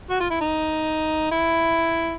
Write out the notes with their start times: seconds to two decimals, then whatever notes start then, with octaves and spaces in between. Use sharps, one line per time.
0.10 F#4
0.20 F4
0.30 E4
0.41 D#4
1.32 E4